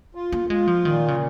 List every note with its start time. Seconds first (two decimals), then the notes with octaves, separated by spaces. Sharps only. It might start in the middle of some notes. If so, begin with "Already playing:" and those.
0.15 F4
0.32 A#3
0.50 G#3 F4
0.68 F3
0.85 A#2 D#3
1.08 C#3